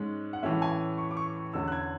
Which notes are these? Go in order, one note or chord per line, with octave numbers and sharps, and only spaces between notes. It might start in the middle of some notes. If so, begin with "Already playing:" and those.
Already playing: G#2 G#3 C#4
F#5
A2 E3 A3 C#4 E5
G#5
C#6
D6
C#6
C#6
E2 D3 A3 C#4 E6
F#6
G#6